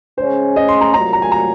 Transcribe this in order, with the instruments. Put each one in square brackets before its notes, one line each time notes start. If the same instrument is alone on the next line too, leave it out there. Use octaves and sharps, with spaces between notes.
[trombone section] C#3 G#3 C#4 [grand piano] C5
[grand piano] D#5
C6
A#5
[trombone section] C2 A#2 F#3 [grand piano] A#5
[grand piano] A#5
G#5
A#5